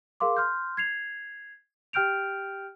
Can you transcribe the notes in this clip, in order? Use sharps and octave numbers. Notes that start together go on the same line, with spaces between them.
G#4 A#4 F5 C6 D6
C6 F6 G6
G#6 C7 F7
G4 G5 F6 G6 D7 F7